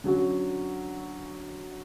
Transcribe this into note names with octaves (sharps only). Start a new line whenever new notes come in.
D3 F#3 C#4 F#4